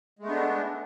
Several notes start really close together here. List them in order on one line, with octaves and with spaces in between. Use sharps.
G#3 A3 B3 D4